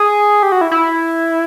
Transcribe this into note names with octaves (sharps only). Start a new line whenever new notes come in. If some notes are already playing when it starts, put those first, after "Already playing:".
Already playing: G#4
G4
F#4
E4
E4